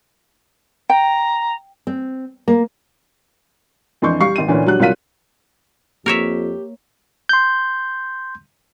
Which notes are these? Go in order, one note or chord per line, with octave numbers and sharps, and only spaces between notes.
G5 A#5
C4
A#3
F2 E3 D4 C6 C#6 G6
G3 F5 C#6 C7
G#1 D#7
D2 A#2 E3 C#4 D4
F#3 G3 D4 F#6
C2 F#3 F4 F5 B6 D#7
F2 A#3 G4 A#4 C#5 E5
C6 G6